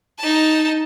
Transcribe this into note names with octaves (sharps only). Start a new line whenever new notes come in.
D#4 A5